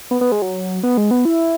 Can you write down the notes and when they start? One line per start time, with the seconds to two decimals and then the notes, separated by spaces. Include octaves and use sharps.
0.11 B3
0.21 B3
0.32 G#3
0.42 F#3
0.83 B3
0.97 G#3
1.11 B3
1.25 E4